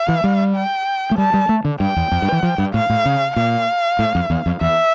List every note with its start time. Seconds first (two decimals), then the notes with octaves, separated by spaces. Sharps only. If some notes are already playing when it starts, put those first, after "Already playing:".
Already playing: F5
0.09 E3
0.24 G3
0.55 G5
1.11 A3
1.18 G3 A5
1.34 G3
1.49 A3
1.65 D3
1.80 G2 G5
1.96 E2
2.12 F2
2.22 G2
2.32 E3
2.43 F3
2.58 G2
2.74 A2 F5
2.90 A2
3.05 C#3
3.36 A#2 F5
3.99 A2
4.15 F2
4.30 E2
4.46 F2
4.61 E2 E5